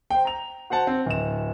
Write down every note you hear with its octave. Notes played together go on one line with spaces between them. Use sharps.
C5 G5
A#5 F7
F#4 C5 F#5 A5
C4
D1 E7